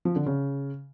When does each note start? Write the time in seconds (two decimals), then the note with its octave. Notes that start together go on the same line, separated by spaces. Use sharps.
0.05 F3
0.16 D3
0.26 C#3